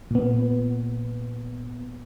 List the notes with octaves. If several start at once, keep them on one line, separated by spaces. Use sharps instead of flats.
A#2 B3